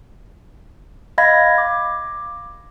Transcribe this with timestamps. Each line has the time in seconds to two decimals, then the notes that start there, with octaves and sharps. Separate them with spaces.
1.18 D#5 F5 B5 G#6 A#6
1.58 D6